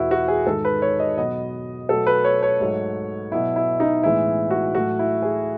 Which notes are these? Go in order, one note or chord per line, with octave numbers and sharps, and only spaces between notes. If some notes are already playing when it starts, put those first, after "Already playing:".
Already playing: E2 B2 A3 E4 F#4
F#4
G#4
G#2 D#3 G#3 A4
B4
C#5
D#5
B2 F#3 B3 D#5
B2 F#3 A3 A4
B4
C#5
C#5
G#2 F#3 A3
B2 F#3 B3 E4
E4
D#4
A2 E3 G#3 B3 E4
F#4
A2 F#3 A3 F#4
E4
G#4